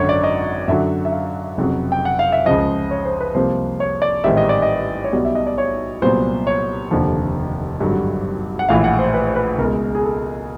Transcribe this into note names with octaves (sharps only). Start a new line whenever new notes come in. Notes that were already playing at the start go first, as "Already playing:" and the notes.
Already playing: G#1 F#2 D3 C#5
D5
D#5
F#2 D3 F#3 E5
E5
F5
F1 F2 C#3 F#3
G5
F#5
F5
E5
C#2 C#3 F3 D#5
C#5
C5
B4
C2 C3 F3 A#3 C5
C#5
D5
A1 G#2 D#3 G3 C4 E5
D#5
D5
D#5
C#5
B1 B2 G3 D5
E5
D#5
D5
C#5
C2 A#2 F#3 B3 C5
C#5
F1 D#2 D3 F3
G#1 G2 D3 F#3
F#5
A#1 A2 E3 F5
F#5
C5
B4
C5
B4
C#2 B2 G#3 A#4
G#4
A4